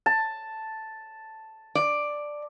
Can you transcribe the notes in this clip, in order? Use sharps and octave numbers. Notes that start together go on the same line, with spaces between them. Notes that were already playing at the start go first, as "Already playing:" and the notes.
A5
D5